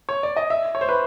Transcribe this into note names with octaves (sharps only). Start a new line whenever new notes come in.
C#5
D5
D#5
E5
C#5
C5
B4